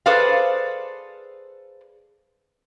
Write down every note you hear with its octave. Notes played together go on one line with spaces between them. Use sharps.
G#4 A4 B4 C5 D5 F5